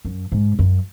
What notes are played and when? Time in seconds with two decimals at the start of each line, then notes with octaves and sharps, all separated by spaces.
0.05 F#2
0.32 G#2
0.59 F#2